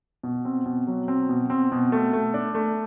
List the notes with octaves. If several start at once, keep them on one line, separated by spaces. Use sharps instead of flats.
B2
C4
B2
F#3
C4
B2
C4
B2
A3
A3
D4
A3